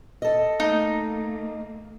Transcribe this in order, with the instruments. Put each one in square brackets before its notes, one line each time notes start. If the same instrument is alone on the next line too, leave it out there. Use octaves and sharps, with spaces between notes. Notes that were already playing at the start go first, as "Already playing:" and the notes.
[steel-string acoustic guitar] A4 D#5
[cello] A3 A#3 [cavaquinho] D#4